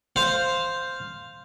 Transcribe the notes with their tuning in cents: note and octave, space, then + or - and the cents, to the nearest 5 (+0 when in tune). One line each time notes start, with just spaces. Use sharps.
C5 +0 F5 +0